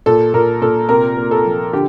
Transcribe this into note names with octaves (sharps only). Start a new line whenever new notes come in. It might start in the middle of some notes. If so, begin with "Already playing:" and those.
A#2 A4
A#2 A#4
A#2 A4
C3 A#4
A#3
A4
F3
D3 G4